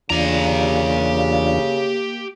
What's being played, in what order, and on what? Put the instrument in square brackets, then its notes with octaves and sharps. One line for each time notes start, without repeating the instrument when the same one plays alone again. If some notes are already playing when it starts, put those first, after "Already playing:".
[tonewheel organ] E2 D4 F4 [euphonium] C#3 [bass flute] A#3 [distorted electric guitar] G4 A#5